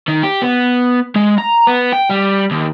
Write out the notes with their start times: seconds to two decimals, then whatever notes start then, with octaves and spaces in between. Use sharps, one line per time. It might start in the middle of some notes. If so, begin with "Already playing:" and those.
0.08 D#3
0.23 G4
0.42 B3
1.16 G#3
1.38 A#5
1.67 B3
1.93 G5
2.10 G3
2.51 D#2